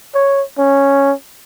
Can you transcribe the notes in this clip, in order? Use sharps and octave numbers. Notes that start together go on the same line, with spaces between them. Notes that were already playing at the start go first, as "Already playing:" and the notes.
C#5
C#4